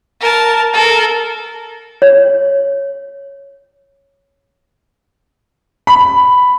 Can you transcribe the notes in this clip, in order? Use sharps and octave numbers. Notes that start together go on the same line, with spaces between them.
A#4 A5
A4 A#4
C#5
B5